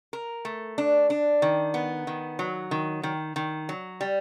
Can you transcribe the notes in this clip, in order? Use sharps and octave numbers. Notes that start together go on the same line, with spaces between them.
A#4
A3
D4
D4
D#3
B3
D#3
F#3
D#3
D#3
D#3
F#3
G3